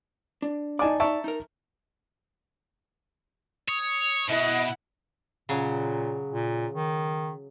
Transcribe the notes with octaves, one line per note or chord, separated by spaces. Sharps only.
D4
D#4 D5 G#5 A5 D6
D#4 D5 E5 A5 C#6
D#4 A#4
C#5 D#6
B2 E4 D#5 F#5
A#2 C#3 F#3
A#2
D#3